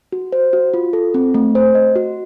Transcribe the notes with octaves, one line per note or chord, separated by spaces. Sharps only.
F#4
C5
F#4
F4
A4
C4
A3
C5
D#5
F#4